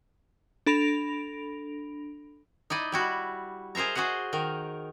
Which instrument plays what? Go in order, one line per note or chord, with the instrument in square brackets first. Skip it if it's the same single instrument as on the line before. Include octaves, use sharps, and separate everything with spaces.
[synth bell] D4 A4 B5 A#6 D7 F7
[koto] D#4 E4 D5 D#5
G3 E4 F#4
G#4 A#4 C5 E5 A#5
F#4 G#4 C5 D#5 F#5
D#3 A#4